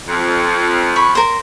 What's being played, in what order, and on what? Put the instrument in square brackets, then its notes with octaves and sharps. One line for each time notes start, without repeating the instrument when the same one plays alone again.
[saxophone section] F2
[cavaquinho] B5 C#6
A#4 C5